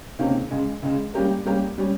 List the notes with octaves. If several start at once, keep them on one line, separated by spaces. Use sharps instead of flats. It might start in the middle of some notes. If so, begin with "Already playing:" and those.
C#2 C3 D#3 A#3 C#4
C#2 C#3 G#3
C#2 C#3 G#3
G3 A#3 C#4 G4 A#4
G3 A#3 C#4 G4 A#4
G3 C#4